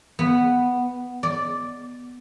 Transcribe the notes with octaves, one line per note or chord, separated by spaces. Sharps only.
B3
D5